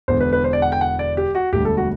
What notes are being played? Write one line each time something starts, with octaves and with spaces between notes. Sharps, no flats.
E1 E2 D3 C5
B4
B4
C5
D5
F#5
G5
F#5
D5
G4
F#4
E1 D2 D3 G3 G4
A4
F#4